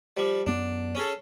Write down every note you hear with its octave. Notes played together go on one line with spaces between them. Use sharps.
F3 G3
F#2 B3 D4
C#4 G#4 A4